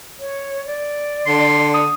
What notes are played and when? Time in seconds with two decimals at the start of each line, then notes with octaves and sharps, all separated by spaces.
0.20 C#5
0.66 D5
1.26 D3 C6
1.74 D#6